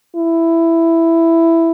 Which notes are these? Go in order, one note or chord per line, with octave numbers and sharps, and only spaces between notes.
E4